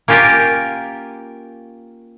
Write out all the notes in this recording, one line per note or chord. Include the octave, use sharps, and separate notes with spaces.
A#3 C#4 F4 G4 A#4